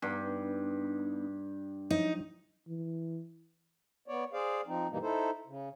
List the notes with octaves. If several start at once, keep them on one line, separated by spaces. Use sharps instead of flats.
G2 B3 D4 D#4
F3 F#3 D#4
E3
B3 C#5 D5
G#4 C5 D5 F5
F3 C4 D#4
G2 B2 E3 G3 A#3 D#4
D#4 E4 A4 C5
C#3